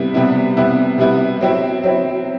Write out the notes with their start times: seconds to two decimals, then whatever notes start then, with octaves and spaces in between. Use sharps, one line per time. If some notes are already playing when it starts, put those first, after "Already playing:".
Already playing: C3 G3 B3 E4
0.14 C3 G3 B3 E4
0.57 C3 G3 B3 E4
0.98 C3 G3 B3 E4
1.41 F#3 C4 E4
1.83 F#3 C4 E4